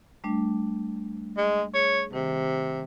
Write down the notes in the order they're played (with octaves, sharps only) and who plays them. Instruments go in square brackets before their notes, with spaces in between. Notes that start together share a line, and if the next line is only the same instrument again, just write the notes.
[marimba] G3 A3 D4
[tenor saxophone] G#3
[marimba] G#4 [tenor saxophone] C#5
[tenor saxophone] C3 [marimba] D#3